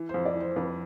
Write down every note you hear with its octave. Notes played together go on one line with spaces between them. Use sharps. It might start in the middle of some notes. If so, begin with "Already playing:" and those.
Already playing: E3
C5
F2
D5
E3
C5
F2 B4